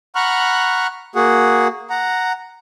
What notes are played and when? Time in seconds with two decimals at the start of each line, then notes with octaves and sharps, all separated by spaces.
0.15 F#5 A#5 B5 C#6 F6 F#6
1.15 A#3 F#4 G#4 F#5
1.90 F#5 A#5